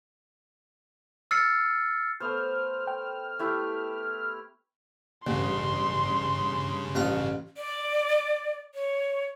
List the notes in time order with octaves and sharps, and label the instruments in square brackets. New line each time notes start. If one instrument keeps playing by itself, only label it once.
[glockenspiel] E6 F6 A6 C7 C#7
[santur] A3 B3 C5 [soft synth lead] F6
[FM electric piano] G5
[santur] A3 E4 G4
[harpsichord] A1 [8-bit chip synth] G2 C#3 [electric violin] C6
[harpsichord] A1 F4 A#5
[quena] D5
C#5